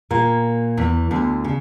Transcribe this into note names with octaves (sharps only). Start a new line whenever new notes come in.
A#2 A#3
E2 E3
D2 D3
C#3